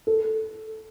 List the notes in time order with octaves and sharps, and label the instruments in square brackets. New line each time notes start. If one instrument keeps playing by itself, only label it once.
[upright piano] A4